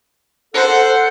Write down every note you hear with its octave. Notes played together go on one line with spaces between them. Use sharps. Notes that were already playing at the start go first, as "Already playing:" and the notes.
A4 C5 F#5